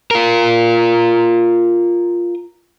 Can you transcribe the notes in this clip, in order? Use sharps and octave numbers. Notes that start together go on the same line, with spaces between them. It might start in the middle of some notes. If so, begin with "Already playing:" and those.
F4 A#4